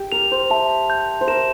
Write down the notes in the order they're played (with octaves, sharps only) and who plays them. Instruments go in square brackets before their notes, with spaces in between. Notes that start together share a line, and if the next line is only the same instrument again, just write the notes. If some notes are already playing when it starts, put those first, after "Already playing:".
Already playing: [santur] G4
[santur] A#4 [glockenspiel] F7
[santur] C5
[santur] E5 [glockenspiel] A5
[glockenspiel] G6
[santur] C5
[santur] A#4 [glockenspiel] E7